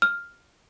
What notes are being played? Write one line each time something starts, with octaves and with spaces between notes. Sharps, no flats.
F6